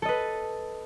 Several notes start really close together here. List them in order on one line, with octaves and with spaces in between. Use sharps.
A4 D#5 B4